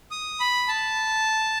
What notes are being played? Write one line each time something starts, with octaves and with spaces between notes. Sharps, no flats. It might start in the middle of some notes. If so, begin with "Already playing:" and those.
D#6
B5
A5